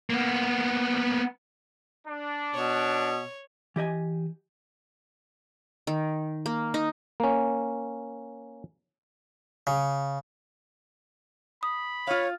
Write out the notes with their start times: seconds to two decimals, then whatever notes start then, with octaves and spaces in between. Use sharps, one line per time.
0.10 A#3 B3
2.08 D4
2.55 B2 C#5
3.76 E3 G4 D#5 G#5
5.87 D#3
6.46 A#3
6.74 D#4
7.20 A#3 C#4
9.67 C#3
11.63 B5 D#6
12.07 F4 C#5 F5